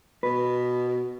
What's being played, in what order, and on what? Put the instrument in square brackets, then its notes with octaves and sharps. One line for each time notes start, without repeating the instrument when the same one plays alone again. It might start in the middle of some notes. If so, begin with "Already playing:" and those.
[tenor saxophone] B2 [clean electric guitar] B4